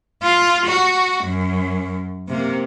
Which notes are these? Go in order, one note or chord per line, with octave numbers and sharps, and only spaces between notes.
F4
F#4
F#2
C3 A#3